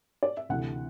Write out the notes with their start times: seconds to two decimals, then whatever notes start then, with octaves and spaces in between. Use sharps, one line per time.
0.23 D5
0.37 E5
0.49 D2 C3 E3 F#5